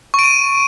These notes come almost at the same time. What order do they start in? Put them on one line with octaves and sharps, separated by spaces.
C#6 D7 D#7